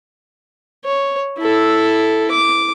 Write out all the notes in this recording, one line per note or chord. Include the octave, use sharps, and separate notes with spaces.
C#5
E4 A4
D6